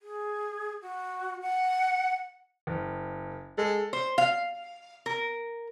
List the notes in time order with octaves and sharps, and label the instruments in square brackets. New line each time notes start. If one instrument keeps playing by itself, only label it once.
[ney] G#4
F#4
F#5
[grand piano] F#1
[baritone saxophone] G#3 [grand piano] A4
[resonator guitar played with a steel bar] C5
F5
A#4